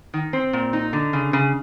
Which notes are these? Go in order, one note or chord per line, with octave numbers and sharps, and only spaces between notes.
D#3
C4
A#2
D#4
D3
C#3
C#3